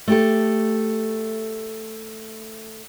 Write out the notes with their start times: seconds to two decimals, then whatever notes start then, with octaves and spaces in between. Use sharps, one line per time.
0.07 A3 G4 A4